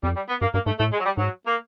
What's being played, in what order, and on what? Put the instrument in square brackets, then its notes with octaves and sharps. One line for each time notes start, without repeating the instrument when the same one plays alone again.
[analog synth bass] F2 [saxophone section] G3
[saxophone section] G3
B3
[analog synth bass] G2 [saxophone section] A#3
[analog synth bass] G2 [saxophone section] A#3
[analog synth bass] G#2 [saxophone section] A3
[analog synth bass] A2 [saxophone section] A3
[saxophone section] G#3
F#3
G3
[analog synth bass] G#2 [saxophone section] F#3
[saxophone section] A#3